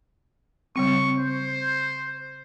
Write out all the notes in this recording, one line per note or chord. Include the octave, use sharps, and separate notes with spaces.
C#3 G3 C4 C#6
C5